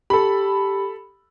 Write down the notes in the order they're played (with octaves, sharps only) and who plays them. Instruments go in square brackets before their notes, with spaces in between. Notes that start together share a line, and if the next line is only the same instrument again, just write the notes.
[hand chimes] G4 [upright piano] A4 B5